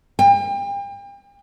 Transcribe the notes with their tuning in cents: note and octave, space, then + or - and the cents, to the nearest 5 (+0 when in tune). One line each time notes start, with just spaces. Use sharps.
G5 +35